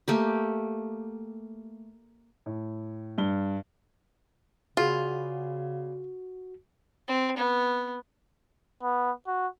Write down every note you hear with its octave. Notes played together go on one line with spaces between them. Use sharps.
A3 A#3 G4
A2
G2 G7
C#3 B3 F4 F#4 G#4 D5
C4
B3
B3
F#4